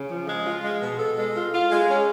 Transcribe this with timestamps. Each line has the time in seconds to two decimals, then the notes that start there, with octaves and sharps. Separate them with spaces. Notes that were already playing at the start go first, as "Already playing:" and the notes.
Already playing: C#3
0.10 F3
0.27 G#3
0.46 F4
0.63 G#3
0.82 B2
0.99 B2 A4
1.17 G#3
1.35 F4
1.54 F4
1.71 G#3
1.89 C#4